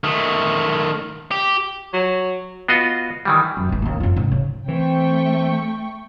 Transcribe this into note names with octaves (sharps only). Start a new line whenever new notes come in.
D#3 A3
G4
F#3
B3 F4 F#4 D#5
D#3 E3 G3
F#2
D1 A1
D#2 D#3
F#2 F4
G#2 C#3
C#3
E3 A3 C4 G5 C#6